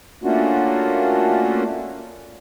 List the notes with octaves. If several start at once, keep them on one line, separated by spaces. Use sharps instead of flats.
A3 A#3 C#4 D4 F4 F#4